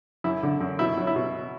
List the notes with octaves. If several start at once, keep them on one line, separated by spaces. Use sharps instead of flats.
F#2 E4
D3
F#2
B2 E4
F#3
E4
B2